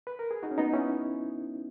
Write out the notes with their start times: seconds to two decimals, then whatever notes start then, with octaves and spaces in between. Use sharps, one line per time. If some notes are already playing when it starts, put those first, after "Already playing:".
0.07 B4
0.19 A#4
0.31 G#4
0.43 D#4 F#4
0.51 C#4
0.58 B3 D#4
0.73 C#4 E4